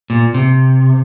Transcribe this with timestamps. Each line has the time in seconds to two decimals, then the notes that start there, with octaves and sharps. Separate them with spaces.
0.10 A#2
0.34 C3